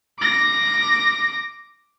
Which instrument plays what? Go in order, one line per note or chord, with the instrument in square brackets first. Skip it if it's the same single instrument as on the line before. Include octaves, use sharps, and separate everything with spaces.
[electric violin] D6 A#6